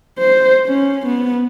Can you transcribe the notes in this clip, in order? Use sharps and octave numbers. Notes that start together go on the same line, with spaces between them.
C5
C#4
B3